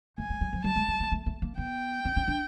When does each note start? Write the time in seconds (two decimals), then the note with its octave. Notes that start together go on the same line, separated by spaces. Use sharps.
0.18 A3 G#5
0.30 G#3
0.41 G3
0.53 F3
0.64 G3 A5
0.76 G#3
0.88 G#3
1.00 A3
1.12 A3
1.26 A3
1.42 A#3
1.58 B3 G5
2.05 C4
2.16 C#4
2.28 D4